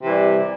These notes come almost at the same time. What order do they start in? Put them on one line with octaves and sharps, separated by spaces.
C3 E3 G3